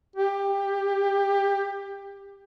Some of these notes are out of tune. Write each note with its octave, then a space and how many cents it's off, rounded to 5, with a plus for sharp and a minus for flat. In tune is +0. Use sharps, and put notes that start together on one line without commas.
G4 +20